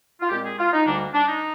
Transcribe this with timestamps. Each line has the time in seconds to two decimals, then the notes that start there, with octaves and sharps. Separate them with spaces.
0.21 F4
0.29 A#2 G#3 C4 G4
0.44 G#4
0.58 F4
0.73 D#4
0.86 D2 D3 G3 A#3 D4
1.14 D4
1.28 D#4